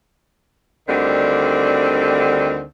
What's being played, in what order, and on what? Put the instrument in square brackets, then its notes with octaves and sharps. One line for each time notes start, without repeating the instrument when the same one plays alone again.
[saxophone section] D2 D3 D#3 G3 C4